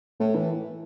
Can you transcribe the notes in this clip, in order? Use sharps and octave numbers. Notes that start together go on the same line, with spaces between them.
A2
E3